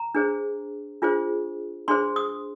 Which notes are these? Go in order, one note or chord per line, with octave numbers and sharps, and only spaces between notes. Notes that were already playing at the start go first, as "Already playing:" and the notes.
Already playing: A#5
D4 G#4 C5
D4 F4 G#4 C5
D4 G#4 C5 C6
D#6